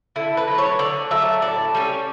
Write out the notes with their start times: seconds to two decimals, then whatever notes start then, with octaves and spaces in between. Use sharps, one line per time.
0.16 D3 E4
0.37 B4
0.47 F#3 A3
0.58 C#5
0.79 D3 D5
1.11 F#3 A3 E5
1.42 A2 D5
1.74 G3 C#4